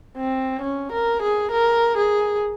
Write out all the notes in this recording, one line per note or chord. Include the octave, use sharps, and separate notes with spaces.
C4
C#4
A#4
G#4
A#4
G#4